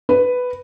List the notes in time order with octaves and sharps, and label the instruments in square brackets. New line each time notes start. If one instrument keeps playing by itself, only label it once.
[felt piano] B4